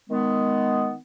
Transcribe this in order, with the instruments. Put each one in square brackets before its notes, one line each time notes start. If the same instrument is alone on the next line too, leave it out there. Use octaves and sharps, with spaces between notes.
[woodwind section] D#3 G#3 B3